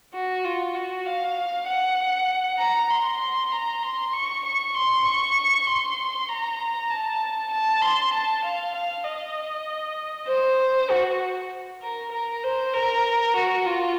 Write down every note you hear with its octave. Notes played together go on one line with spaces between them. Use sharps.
F#4
F4
F#4
F5
F#5
A#5
C6
A#5
C6
C#6
C#6
C6
C#6
C6
A#5
A5
A5
C6
A5
F5
F5
D#5
C5
F#4
A#4
A#4
C5
A#4
F#4
F4